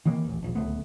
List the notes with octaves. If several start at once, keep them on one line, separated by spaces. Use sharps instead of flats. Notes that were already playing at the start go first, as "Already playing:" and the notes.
D#3 E3 A#3
D#1 A1
D#1 A#1
D1 C#2 A3 B3